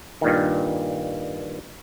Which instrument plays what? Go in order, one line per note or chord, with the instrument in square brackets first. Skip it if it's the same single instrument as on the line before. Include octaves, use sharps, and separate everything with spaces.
[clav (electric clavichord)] G2 A#2 D#3